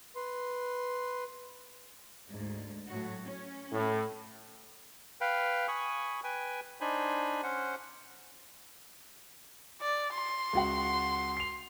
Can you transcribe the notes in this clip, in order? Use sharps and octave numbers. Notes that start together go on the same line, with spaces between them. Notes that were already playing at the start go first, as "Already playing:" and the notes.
B4 C6
D2 G#2
A2 F#3 F#4
C#4
A2
B4 F5 G5
G#5 B5 C#6 D#6
B4 G5 G#5
D4 D#4 C5 G#5 B5
C#4 C5 F#5
D5
C6
C#2 F#4 F#5
C7 F7